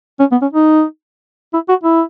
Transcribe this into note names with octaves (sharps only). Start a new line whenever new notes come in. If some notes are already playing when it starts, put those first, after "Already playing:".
C#4
B3
C#4
D#4
E4
F#4
E4